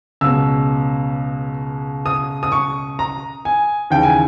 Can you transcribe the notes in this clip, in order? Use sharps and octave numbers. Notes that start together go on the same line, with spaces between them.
C#2 B2 E6
D#6
D#6
C#6
A#5
G#5
D#2 C#3 E3 G5
G#5